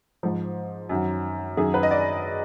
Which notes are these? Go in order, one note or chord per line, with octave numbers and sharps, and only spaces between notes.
G#2 F3
F#2 D#3 F#3
F#2 D#3 F#3 G#4
B4
D#5
D5